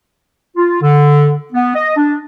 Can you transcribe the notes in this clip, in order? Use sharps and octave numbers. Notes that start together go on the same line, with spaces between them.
F4
D3
B3
D#5
D4